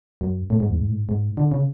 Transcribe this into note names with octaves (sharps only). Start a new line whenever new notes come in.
F#2
A2
G#2
E2
G#2
A2
G#2
G#2
D3
C#3